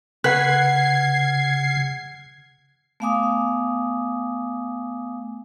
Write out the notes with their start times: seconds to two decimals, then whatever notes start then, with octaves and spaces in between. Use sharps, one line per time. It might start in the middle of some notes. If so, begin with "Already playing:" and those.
0.24 C#3 B4 F#5 F#6 G#6 C7
3.00 A3 B3 F5 G#5 D6 D#6